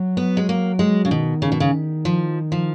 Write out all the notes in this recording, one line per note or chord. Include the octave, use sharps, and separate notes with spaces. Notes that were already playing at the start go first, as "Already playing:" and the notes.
Already playing: F#3
B3
G#3
A#3
G#3
C#3
B2 D#3
C#3
B2
C#3
F3
F3